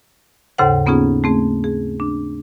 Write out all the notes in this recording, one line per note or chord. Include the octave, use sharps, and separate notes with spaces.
D#2 G#2 C#3 A4 C5 F#5
A#3 B3 C#4 D#4 F4 G#4
A3 C4 G#4
G#4
D4